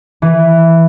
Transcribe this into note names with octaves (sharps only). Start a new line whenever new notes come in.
E3